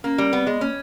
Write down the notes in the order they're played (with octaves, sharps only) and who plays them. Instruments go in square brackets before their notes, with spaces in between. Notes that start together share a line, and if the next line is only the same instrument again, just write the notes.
[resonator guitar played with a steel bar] A#3 [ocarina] C#4
[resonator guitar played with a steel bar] G3
[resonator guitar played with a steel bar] B3 [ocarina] C4
[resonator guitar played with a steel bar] G#3 [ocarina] B3
[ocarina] A#3 [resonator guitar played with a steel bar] C#4